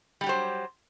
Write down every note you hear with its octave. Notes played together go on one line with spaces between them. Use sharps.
F#3 G3 G4 C5